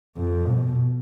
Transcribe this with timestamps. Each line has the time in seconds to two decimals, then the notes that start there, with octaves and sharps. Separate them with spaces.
0.17 F2
0.47 B2